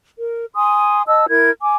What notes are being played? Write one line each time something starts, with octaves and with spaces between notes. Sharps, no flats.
A#4
G#5 C6 D#6
D#5 A5 E6
E4 A#4 G#6
G#5 D6